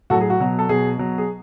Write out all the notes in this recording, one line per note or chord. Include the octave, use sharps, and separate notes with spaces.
A2 F#3 F#4 A4
G#4
F#4
B2 F#3
A4
B2 F#3 G#4
B2 F#3
G#4